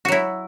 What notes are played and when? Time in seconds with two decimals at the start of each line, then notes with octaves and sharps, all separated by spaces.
0.05 F#4
0.08 F#3
0.12 E4